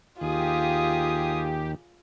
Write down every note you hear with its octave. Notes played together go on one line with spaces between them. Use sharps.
D#2 F4 G4 G#4 D#6